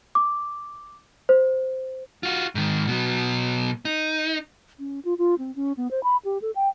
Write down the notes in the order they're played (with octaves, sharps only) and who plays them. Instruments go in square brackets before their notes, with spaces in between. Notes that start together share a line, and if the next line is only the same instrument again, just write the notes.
[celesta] D6
C5
[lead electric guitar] F4 F#4
G#2 D#3
B2 F#3
D#4
[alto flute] C#4
F4
F4
C4
C#4
B3
C5
B5
G4
A4
G5